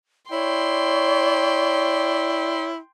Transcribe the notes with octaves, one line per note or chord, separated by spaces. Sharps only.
E4 C#5 D5 G5 C6